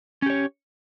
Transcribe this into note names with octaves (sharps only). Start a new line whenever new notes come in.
C#4 G4 C#5